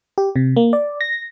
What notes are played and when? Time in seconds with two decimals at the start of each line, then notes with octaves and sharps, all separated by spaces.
0.18 G4
0.36 C3
0.56 A#3
0.73 D5
1.01 A#6